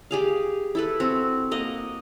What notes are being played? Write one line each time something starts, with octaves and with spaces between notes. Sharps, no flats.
G4 G#4 F5
E4 A4 B4
C4 F#4
A#3 D#5 F#5